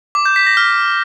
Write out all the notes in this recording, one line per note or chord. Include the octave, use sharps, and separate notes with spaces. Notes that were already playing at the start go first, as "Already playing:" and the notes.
D6
G6
B6
A#6
F6